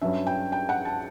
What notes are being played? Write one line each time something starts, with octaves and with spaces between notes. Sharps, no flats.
G2 F#3 C#4 E5
G5
G5
F#5
A5